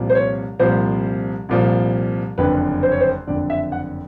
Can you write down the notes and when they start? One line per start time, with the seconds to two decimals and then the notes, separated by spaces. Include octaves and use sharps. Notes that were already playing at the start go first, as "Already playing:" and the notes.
Already playing: C2 A#2 F3
0.10 C5
0.15 C#5
0.59 C2 A#2 F3 C5
1.49 C2 A#2 F3
2.38 F#1 F2 D3 B4
2.83 C5
2.92 C#5
3.00 C5
3.27 F#1 F2 D3 D5
3.50 E5
3.72 F#5